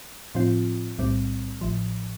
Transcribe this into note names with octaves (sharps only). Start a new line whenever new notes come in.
A2 F3 C4 F4
B1 A2 G3 C4
A1 A2 F3